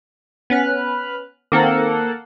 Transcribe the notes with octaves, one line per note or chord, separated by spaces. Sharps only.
B3 C#4 B4 F6 F#6
D#3 A#3 C4 A4 A#4 F#5